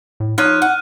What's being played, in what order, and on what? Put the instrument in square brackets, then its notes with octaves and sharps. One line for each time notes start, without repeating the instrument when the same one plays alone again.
[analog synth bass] A2
[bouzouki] F3 C#5 [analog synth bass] D#4 [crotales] F6 F#6 D#7
[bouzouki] F#5